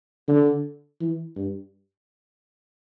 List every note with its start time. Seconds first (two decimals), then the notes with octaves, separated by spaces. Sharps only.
0.28 D3
1.01 E3
1.36 G2